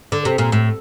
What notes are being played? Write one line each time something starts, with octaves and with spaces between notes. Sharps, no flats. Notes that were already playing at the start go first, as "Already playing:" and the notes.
D3
C3
A#2
A2